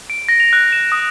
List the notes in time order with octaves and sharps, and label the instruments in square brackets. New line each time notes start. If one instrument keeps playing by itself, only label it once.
[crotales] D7
A#6
F7
F#6
E7
D#6